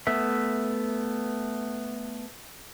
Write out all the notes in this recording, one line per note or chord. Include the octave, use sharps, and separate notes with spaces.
A3 B3 E5